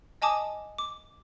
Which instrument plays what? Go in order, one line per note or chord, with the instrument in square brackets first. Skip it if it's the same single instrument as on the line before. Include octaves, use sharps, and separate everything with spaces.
[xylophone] D#5 G#5 A5 D6 D#6
D6